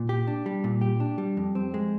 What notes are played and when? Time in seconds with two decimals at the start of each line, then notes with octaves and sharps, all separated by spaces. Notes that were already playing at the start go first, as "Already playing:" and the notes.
Already playing: A#2
0.09 G4
0.27 D4
0.46 G3
0.64 A#2
0.81 G4
1.00 D4
1.18 G3
1.37 F2
1.55 C4
1.74 G#3